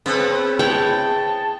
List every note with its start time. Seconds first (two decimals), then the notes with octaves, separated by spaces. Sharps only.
0.06 C#3 B3 C4 A4 B4
0.59 E4 G#4 C#5 G5 A5